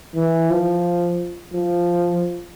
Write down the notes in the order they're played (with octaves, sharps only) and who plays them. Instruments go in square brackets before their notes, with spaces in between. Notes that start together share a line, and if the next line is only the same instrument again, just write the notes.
[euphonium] E3
F3
F3